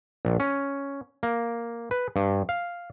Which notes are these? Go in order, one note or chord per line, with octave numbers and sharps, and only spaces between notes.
A#1
C#4
A#3
B4
G2
F5